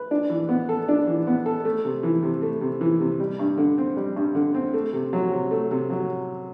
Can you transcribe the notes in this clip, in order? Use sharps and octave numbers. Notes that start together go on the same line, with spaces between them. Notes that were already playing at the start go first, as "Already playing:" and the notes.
Already playing: B4
D4
E3
B3
A4
D4
E3
B3
A4
A3
C3
E3
C3
A3
C3
E3
C3
G3
G2
D3
C4
G3
G2
D3
C4
A3
C3
F#3
C3
A3
C3
F#3